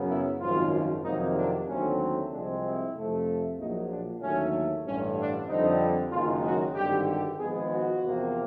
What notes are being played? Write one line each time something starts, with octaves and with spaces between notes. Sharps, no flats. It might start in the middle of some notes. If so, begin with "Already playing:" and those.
Already playing: F#2 C#3 F#3 B3
E4
G#1 F#2 C#3 F3 F4
F2 C3 D#3 F#3 A#3 D#4
D4
D#2 D3 F#3 A3 C4 C#4
C2 C3 F3 G#3 C4 D4
E4
F2 C3 F3 A3
A#1 A#2 F#3 D#4
D4
D#2 D3 F#3 A3 C#4
A1 G2 D3 C#4
D4
F2 D3 G3 C4 D#4
F#1 F#2 D#3 G#3 F4
F#4
G#1 G2 D3 G4
G4
G#1 G#2 F3 G#3 B3 G#4
F#4
E2 C3 F3 A#3